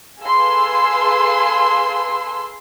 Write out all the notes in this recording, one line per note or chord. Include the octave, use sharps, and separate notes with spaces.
G#4 A4 B4 F5 C6 E6